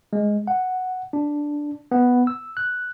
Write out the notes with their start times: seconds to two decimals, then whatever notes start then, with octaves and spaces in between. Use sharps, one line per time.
0.13 G#3
0.47 F#5
1.13 D4
1.91 B3
2.27 E6
2.57 F#6